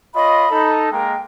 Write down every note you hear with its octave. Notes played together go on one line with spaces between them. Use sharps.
F4 C#5 D#5 B5
D#4 A4
G#3 A#3 A#4 G5